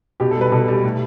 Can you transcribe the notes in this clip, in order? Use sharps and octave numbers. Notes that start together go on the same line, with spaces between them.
B2 G4
A4
G3 B4
B2 A4
G3
A2